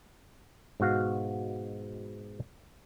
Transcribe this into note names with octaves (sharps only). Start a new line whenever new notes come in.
G#2 B2 F#4 F5